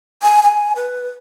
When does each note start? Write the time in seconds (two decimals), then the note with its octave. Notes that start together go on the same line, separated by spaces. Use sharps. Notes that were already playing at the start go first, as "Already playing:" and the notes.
0.23 G#5
0.43 G#5
0.76 B4